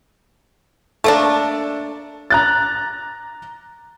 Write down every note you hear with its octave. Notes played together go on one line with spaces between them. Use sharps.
A3 A#3 D4 A4
A#5 F#6 A6